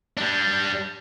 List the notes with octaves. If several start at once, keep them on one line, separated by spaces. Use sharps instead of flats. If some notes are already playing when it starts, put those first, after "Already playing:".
G3 D4